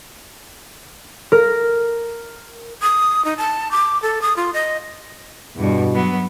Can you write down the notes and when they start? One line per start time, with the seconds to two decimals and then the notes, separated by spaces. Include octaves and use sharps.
1.32 A#4
2.82 D#6
3.25 D#4
3.38 A5
3.71 D6
4.02 A4
4.22 D#6
4.37 F4
4.53 D#5
5.55 E2 G2 B2
5.93 F#3 B3